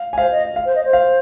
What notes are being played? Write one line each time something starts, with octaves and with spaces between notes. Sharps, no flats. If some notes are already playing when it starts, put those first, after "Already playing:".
Already playing: F5
G#5
C5 F5
D#5
F5
C5
D#5
C5
F5